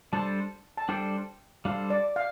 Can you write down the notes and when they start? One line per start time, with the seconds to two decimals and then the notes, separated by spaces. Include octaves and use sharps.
0.13 G3 D4 A4 C5 A5
0.77 A5
0.89 G3 D4 A4 C5 G5
1.65 G3 D4 A4 C5 F5
1.90 D5
2.16 F5